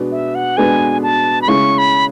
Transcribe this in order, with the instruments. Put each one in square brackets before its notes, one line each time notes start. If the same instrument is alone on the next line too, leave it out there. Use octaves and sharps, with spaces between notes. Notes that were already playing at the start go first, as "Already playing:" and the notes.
Already playing: [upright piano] B2 G#3 B3 D4
[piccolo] E5
F#5
[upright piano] B2 G#3 B3 D4 [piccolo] G#5
[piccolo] A5
B5
[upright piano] C#3 G#3 C#4 E4 [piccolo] C#6
[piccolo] B5